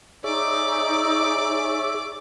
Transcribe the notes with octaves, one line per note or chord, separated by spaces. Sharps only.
D#4 G#4 C#5 D5 E5 D6